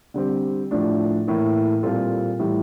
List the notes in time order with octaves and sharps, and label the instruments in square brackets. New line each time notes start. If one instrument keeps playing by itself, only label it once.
[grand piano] D3 G3 C4 G4
A2 F3 A3 D4
A2 E3 A#3
A#2 G3 C4 F4 A4
A2 E3 G3